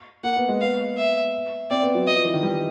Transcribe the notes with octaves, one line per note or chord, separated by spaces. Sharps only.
A#3 F#5
B3
G#3
B3 F5
E5
C4 D5
B3
F#3
D#5
F3
E3
D#3
G3